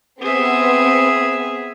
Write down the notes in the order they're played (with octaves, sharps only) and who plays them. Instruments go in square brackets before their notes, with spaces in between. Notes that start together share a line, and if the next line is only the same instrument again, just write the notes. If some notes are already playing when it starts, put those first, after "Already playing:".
[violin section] B3 C4 [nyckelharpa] G#4 E5